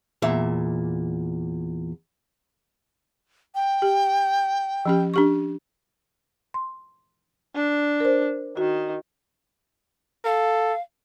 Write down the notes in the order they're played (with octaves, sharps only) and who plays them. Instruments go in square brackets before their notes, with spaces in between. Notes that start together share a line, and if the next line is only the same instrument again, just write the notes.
[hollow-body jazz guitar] E2 A#2 E5
[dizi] G5
[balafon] G4
F3 C#4 G4
D4 G4 C#6
[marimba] C6
[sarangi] D4
[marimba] A#4 C5
[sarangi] D#3 [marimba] F#4
[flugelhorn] A4 [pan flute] F5